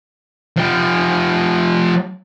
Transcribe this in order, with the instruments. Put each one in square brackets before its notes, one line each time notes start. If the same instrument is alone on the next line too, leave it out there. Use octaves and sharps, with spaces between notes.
[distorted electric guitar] F3 G4